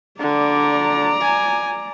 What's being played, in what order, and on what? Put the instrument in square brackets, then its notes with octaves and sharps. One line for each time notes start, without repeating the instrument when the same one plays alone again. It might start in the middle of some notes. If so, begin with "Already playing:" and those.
[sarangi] D3 [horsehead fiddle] D5 A#5
[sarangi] G#5